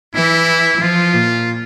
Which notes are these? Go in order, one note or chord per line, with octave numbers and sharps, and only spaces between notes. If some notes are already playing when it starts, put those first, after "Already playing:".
E3 E4
F3 F4
A#2